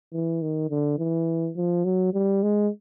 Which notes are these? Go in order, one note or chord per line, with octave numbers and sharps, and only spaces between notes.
E3
D#3
D3
E3
F3
F#3
G3
G#3